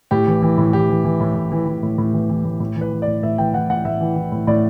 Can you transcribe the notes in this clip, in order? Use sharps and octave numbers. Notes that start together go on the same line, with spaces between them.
A2 G4
E3
E3
A2
A2 G4
E3
E3
A2
A2
E3
E3
A2
A2
E3
E3
A2
A2
E3
B4
E3
D5
A2
A2 E5
E3 G5
E3 F#5
A2 F#5
A2 E5
E3
E3
A2
A2 D5